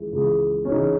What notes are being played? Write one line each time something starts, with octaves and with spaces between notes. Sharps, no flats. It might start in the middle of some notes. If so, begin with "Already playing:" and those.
Already playing: C#2 C#3 E3
C#2 C#3 E3
C#4
C#3 E3 D#4